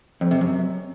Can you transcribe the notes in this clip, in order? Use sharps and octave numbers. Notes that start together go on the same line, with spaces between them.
F2
C3
F#2